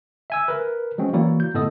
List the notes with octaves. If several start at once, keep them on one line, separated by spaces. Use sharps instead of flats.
E5 G#5 E6
A#4 B4
F#3 G#3 C4 C#4
E3 A#3 E4 F#4 C#5 D5
G6
G1 A2 B3 A4 D#5 D#6